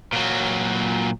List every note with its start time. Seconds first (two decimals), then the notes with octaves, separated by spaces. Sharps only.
0.13 A#2 F#3